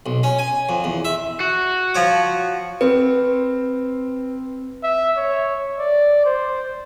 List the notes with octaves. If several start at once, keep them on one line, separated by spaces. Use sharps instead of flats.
B1
C#4
G#5
F2
E2
E5
F#4
F3 C#5 D6
C4 B4
E5
C#5
D5
C5